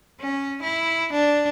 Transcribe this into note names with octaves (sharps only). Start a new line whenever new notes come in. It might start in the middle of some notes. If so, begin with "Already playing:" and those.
C#4
E4
D4